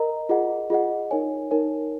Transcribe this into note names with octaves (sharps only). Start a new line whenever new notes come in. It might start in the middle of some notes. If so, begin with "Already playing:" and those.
Already playing: A#4 D#5 A#5
F4 G#4 D#5 F#5
F4 G#4 D#5 F#5
D#4 A#4 C#5 G#5
D#4 A#4 C#5 G#5